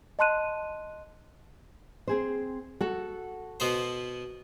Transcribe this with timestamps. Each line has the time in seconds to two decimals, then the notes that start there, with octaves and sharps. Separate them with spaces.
0.19 D#5 A5 C6 F#6 D#7
2.08 C4 G#4 C5
2.81 F#4 A4
3.60 B2 B3 C5